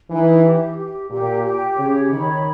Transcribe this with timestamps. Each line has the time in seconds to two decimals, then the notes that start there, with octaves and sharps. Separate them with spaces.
0.10 E3 D#4
0.43 G4
0.77 G4
1.10 A#2 G4
1.44 G4
1.78 C#3 C#5
2.10 D#3 B5